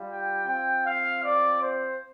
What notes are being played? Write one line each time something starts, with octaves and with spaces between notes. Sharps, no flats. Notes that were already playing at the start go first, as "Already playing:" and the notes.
Already playing: G3 F4
G5
C4 F4 G5
F5
D5
C5